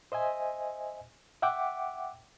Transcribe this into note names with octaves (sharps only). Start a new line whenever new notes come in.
C5 D#5 E5 G#5
E5 F#5 G5 D6